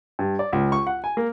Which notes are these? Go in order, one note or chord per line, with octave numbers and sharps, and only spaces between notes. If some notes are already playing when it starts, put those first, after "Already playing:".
G2
D5
C#2
C#6
F#5
G#5
A#3